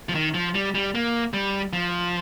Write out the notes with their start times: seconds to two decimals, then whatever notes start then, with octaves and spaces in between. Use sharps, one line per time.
0.09 F3
0.15 D#3
0.34 F3
0.55 G3
0.75 G3
0.95 A#3
1.33 G3
1.73 F3